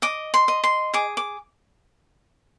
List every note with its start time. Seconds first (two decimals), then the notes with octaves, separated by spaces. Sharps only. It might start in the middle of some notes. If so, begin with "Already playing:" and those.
0.02 D#5 D6
0.34 C6
0.48 D#5
0.64 C6
0.94 G#4 D6
1.17 D6